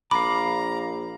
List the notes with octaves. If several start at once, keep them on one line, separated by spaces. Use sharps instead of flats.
A#1 F5 A#5 B5 D6